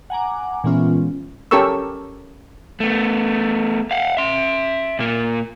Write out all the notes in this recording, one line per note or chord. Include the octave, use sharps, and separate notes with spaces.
F#5 G#5 A#5 D6
A#2 E3 G#3 B3 C#4 F4
C#4 G4 A4 A#4 C#6 E6
A3 B3
F5 F#5
E5 C6
A#2 A#3